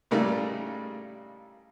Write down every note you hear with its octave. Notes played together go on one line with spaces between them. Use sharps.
A2 C#3 G3 A3 A#3 D#4